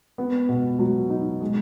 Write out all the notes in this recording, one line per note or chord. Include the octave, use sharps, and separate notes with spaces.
B3
B2
F#3
D#4
G#3